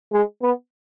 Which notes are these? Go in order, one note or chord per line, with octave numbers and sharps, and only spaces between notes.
G#3
B3